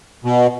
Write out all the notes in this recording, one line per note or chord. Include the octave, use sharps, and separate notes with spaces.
B2